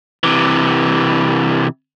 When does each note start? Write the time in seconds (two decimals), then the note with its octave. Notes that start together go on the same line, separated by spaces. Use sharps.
0.24 C3 E3